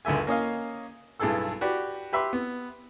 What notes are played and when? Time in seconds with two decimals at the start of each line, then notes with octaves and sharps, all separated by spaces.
0.05 C#2 F#2 D3 E5 G#5
0.27 A#3 C#4 D#5 F5
1.20 B1 G2 E4 G#4 A4 E6
1.61 F#4 G4 B4 D5
2.13 G4 B4 E5 B5 C6 D6
2.33 B3